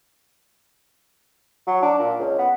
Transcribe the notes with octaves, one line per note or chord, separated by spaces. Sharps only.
F#3
D4
A#2
C#2
B3